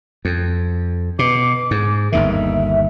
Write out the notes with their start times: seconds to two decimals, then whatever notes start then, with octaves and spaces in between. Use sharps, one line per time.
0.25 F2
1.19 B2 D6
1.71 G#2
2.12 G1 D#2 D#3 E5